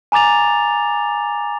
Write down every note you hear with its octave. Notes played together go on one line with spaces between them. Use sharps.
G#5 A#5 D6 A6 F7